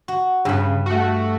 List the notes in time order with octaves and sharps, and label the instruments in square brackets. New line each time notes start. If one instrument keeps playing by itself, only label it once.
[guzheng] F#4
[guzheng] G2 B5 [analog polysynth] C#3
[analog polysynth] A3 F#4